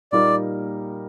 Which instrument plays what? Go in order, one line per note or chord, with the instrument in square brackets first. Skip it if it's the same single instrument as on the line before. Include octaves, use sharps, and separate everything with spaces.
[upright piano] A#2 G3 A#3 D#4 A#4 [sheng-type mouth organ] D5